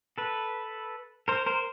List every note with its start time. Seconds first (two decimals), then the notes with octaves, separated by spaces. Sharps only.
0.18 A4 B4
1.28 A#4 C5
1.46 A#4 C5